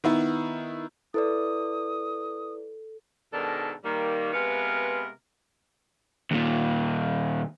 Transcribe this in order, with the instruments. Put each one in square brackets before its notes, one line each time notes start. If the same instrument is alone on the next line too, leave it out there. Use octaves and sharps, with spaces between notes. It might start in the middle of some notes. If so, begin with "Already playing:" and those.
[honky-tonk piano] D#3 B3 E4
[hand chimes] E4 B4 D5 [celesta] A4 [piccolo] D#6
[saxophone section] G#2 B2 D#3 D4 A4 A#4
D#3 G3 A#3
C3 G#3 B3 A#4 B4 F5
[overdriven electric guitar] D#2 A#2